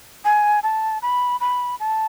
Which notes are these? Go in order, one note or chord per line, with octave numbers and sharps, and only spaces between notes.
G#5
A5
B5
B5
A5